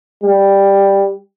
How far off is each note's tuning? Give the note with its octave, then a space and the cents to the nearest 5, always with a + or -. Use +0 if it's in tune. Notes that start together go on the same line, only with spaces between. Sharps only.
G3 +10